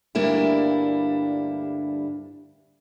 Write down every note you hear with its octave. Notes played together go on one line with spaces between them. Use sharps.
D2 G2 G3 A#3 D4 E4